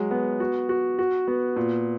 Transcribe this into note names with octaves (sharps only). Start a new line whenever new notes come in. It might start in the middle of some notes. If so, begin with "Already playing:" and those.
Already playing: F#3 G#3
B3
F#4
F#4
F#4
B3
A#2